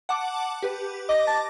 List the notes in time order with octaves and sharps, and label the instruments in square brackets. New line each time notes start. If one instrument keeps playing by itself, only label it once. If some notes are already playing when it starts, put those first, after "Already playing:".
[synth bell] F#5 A5 D6
G4 B4
[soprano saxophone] D#5 [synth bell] D6 A#6
[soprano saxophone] A5